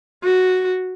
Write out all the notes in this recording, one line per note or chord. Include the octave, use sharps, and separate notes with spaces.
F#4